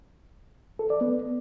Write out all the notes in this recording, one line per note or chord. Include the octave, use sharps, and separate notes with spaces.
A4
D5
B3